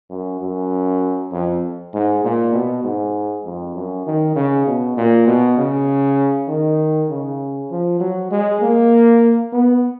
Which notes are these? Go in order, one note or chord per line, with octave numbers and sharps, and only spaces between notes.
F#2
F#2
F2
G#2
A#2
B2
G#2
F2
F#2
D#3
C#3
B2
A#2
B2
C#3
D#3
C#3
F3
F#3
G#3
A#3
B3